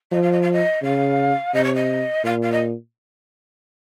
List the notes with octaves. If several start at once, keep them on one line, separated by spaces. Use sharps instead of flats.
F3 D#5
F5
D#5
F5
D#5
C#3 F5
C3 D#5
C#5
D#5
A#2 F5
F5
D#5